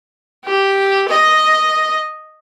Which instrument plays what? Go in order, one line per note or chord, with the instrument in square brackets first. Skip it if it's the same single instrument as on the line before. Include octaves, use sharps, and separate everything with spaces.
[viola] G4
D#5